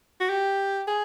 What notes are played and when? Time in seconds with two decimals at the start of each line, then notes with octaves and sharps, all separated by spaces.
0.20 F#4
0.29 G4
0.87 G#4